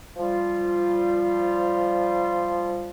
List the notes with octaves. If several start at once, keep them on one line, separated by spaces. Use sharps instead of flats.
F3 G3 F4